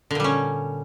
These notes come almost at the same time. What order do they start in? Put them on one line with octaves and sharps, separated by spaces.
D3 A#2 G3 C#4